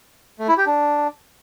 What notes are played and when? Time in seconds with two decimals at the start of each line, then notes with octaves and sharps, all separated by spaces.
0.39 A3
0.48 E4
0.57 G4
0.66 D4